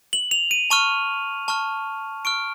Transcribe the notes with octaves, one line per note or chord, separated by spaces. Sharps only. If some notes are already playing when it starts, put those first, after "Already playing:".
F#7
F7
D#7
A5 C#6 F6 D#7
A5 C#6 F6
C#6 F6 D7